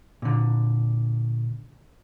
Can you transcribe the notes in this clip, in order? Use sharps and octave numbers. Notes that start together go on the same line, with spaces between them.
A#2 D3